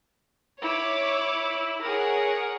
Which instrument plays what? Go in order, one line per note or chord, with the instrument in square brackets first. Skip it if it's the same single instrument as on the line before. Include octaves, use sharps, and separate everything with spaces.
[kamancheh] E4 [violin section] C#5 D6
[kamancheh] G#4 A#4 [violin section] C#5 F#5